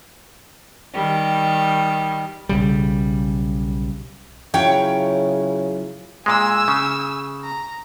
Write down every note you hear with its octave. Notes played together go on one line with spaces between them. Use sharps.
D#3 G3
B1 C#3 G3
C#3 F#3 E4 F4 C#5 G5
A#2 G#3 G#5 E6
C#3
A#5